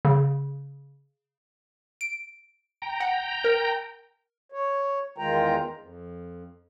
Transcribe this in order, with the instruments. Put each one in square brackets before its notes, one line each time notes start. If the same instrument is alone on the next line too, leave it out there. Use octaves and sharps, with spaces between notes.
[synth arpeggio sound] C#3
[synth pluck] D7
[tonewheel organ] G5 A#5
[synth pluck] F#5
A#4
[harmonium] C#5
E2 D#3 G#3 F4 G5 A#5
F2